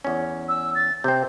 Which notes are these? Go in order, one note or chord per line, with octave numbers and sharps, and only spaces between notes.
E2 C#4
E6
A6
C3 C4 G6